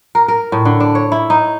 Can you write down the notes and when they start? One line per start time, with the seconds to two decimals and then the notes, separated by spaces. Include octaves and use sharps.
0.15 A#4
0.28 A#4
0.52 A2
0.65 D3
0.80 D4
0.95 C#5
1.12 E4
1.30 D#4